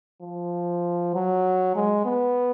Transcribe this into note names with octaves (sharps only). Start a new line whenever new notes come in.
F3
F#3
G#3
B3